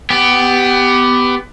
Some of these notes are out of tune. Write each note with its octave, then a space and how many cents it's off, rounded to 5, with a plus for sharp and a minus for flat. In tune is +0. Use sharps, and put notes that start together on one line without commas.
B3 +20 G4 +0